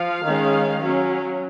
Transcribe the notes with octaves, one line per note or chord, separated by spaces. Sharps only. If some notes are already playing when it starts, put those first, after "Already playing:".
Already playing: F3 F5
D#3 G#3 C#4
F#3 C#4